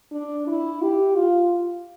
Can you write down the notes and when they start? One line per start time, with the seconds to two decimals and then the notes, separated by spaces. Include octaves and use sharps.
0.12 D4
0.48 E4
0.82 G4
1.16 F4